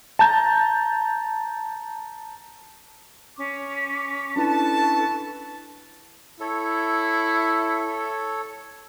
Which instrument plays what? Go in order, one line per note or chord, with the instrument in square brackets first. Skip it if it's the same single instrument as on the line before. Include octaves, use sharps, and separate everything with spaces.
[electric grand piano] A5 A#5 G6
[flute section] C#4 C#6 D6
[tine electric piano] C#4 D4 E4 [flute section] A4 B4 C#6 [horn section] A5
[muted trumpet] E4 [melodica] A4 C#5